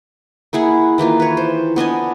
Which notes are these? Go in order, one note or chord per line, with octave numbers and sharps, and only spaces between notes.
A#3 E4 G#4 F#5
D#3 E3 A#3 F4
B4 C#5
C5
B3 D4 D#5 G#5